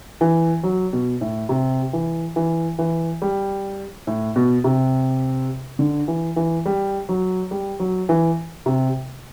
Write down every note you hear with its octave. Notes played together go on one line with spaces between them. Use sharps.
E3
F#3
B2
A2
C3
E3
E3
E3
G3
A2
B2
C3
D3
E3
E3
G3
F#3
G3
F#3
E3
C3